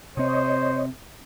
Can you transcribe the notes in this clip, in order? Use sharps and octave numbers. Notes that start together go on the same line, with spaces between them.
C3 C4 C5 C#5 D#5